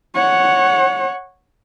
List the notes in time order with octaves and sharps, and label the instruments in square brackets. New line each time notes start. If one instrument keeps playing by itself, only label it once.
[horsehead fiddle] C#5 F#5